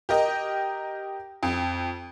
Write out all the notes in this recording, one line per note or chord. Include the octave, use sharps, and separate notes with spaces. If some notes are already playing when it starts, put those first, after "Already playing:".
G4 A#4 D#5
F2